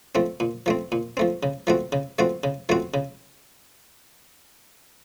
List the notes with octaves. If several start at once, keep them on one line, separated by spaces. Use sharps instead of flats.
F3 A3 C4
A#2
F3 A3 C4
A#2
F3 A3 C4
C#3
F3 A3 C4 F#4
C#3
F3 A3 C4 F#4
C#3
F3 A3 C4 F#4
C#3